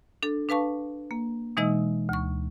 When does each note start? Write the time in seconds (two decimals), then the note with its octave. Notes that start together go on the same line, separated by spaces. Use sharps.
0.23 D4 A4
0.49 D4 B4 F5 A5 C#6
1.11 A#3
1.57 B2 E3 G#3 D#4 D#5 E6
2.09 D2 C#6